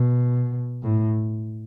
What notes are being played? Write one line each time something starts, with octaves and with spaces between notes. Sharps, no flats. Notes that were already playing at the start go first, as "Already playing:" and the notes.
Already playing: B2
A2